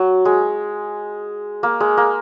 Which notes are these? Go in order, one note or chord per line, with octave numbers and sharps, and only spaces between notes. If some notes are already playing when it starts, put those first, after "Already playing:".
Already playing: F#3
G#3
A#3
G#3
A#3